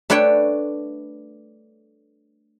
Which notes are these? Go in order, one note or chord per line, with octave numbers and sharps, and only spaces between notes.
A3 D4 B4 C#5 G5